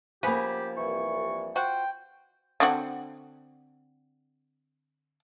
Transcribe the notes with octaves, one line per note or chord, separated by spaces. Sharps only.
C#3 F3 A#3 B3 G4 B5
C2 E3 C#6
F4 F#4 C5 G5
D3 C4 F#4